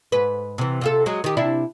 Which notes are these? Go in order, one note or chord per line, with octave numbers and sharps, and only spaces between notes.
G#2 B4
C3 E3
C3 F4 A4
F#3 G#3
D#3 G4
C3 D4 E4